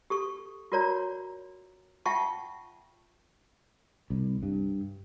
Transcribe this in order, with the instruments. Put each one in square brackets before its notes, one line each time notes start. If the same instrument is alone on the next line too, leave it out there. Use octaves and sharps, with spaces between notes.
[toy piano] G4 A4 C#6
F4 F#4 A#4 C#5 D5 A#5
F4 E5 F#5 G5 A5 C#6
[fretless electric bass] C2
G2